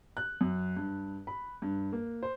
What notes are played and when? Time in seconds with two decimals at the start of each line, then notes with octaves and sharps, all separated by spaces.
0.17 F#6
0.41 F#2
0.77 G2
1.27 B5
1.62 G2
1.92 A#3
2.23 C5